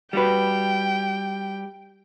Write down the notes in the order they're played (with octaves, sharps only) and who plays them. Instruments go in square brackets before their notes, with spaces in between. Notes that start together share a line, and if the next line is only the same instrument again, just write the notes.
[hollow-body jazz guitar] G3 F#4 B4 [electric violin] G5